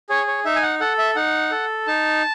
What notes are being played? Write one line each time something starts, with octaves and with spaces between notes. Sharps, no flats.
G#4 C#5
C#5
D#4 E5
G#5
F#5
A4 F#5
E5
D#4 F#5
A4
D#4 A5